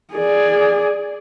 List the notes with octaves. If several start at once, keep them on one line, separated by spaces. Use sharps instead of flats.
G#4 D5